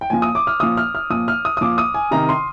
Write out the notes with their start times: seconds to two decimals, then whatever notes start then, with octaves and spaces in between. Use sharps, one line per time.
0.01 G5
0.10 A#2 F3 G#5
0.22 D#6
0.35 D6
0.47 F6
0.60 A#2 F3 D#6
0.77 F6
0.95 F6
1.10 A#2 F3 D#6
1.28 F6
1.45 D#6
1.57 D#6
1.61 A#2 F3 D6
1.78 D#6
1.94 G#5
2.11 C3 D#3 A#5
2.29 C6